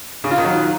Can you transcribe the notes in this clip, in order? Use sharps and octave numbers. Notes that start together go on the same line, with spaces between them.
C#3
F4
D#3
F#3